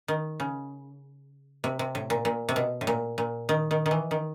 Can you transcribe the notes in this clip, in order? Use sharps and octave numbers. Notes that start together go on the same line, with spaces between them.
D#3
C#3
C3
C3
A2
A#2
A#2
C3
B2
A2
A#2
A#2
D#3
D#3
D#3
E3
D#3